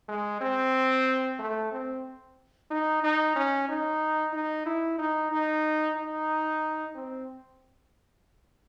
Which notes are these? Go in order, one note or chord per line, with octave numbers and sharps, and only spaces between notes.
G#3
C4
A3
C4
D#4
D#4
C#4
D#4
D#4
E4
D#4
D#4
D#4
C4